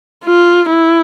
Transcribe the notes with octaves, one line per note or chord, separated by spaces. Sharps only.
F4
E4